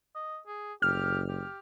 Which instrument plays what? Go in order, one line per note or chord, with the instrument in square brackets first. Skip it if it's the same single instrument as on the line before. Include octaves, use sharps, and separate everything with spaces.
[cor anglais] D#5
G#4
[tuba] F#1 [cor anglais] G4 [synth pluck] F6
[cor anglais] G4